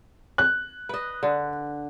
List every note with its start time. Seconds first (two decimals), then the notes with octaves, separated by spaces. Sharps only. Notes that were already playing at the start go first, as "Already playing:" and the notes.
0.38 F#6
0.89 B4 D#5
1.23 D3